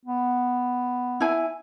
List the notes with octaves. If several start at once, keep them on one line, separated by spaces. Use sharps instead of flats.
B3
E4 G#5